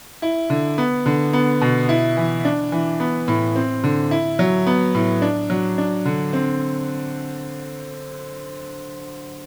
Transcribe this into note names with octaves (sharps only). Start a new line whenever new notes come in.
E4
D3
B3
D3
B3
B2
E4
E3
D4
E3
B3
A2
C4
D3
E4
F#3
B3
A2
D4
F#3
D4
D3
C4